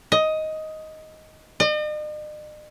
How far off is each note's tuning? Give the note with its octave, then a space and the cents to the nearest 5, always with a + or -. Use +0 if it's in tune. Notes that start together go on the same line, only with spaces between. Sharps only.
D#5 +10
D#5 -45